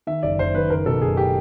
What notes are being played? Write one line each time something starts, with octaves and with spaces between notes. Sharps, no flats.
D#3 E5
F#1 D5
F#1 C5
D#3 B4
F#1 A#4
B2 A4
F#1 G#4
G4